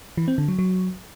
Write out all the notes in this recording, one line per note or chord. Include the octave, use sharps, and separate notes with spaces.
E3
C4
D3
F#3
F#3